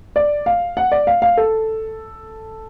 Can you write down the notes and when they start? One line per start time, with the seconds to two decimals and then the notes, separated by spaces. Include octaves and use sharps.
0.16 D5
0.46 F5
0.77 F#5
0.92 D5
1.07 F5
1.22 F5
1.37 A4